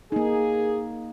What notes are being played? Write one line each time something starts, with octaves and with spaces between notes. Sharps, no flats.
A#3 D#4 G#4